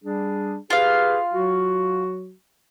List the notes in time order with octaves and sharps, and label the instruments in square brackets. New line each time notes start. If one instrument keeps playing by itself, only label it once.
[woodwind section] G3 D4 G#4
[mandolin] F4 F5 [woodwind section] G4 G#4 B4
[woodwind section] F#3 F#4